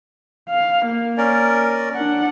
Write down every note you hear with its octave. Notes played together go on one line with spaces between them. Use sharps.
F5
A#3
C#4 A#4 D5
D4 F#5